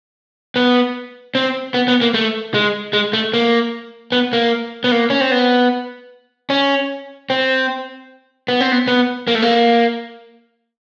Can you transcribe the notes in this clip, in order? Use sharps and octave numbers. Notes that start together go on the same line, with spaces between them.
B3
C4
B3
B3
A#3
A3
G#3
G#3
A3
A#3
B3
A#3
B3
A#3
C#4
C4
B3
C#4
C4
B3
C4
B3
B3
A#3
A3
A#3